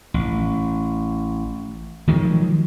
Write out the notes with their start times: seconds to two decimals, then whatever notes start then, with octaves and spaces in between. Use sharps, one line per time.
0.14 A1
2.07 D#3 F3 F#3 G#3